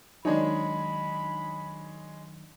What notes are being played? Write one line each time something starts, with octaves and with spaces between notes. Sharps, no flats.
D#3 F#3 G#3 D4 D#4 G#4 C#5 B5